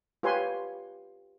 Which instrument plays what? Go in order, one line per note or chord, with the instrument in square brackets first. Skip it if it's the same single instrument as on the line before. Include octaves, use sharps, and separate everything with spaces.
[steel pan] F4 G4 B4 C#5 G#5 C6